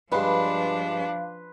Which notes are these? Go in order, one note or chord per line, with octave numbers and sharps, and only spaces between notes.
G2 F3 G#3 D4 B4 F5 C6